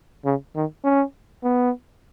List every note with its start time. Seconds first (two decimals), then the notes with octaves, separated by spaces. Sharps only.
0.25 C#3
0.56 D#3
0.84 C#4
1.44 B3